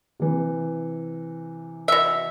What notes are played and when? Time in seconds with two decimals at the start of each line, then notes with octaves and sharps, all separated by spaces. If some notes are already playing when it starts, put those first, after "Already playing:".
0.20 C3 E3
1.88 B2 E5